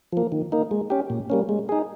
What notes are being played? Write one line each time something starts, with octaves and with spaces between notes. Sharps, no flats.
F3 A#3
D#3
A#3 D#4
G#3
C#4 G4
A#2
G3 A#3 C#4
G#3
D#4 G#4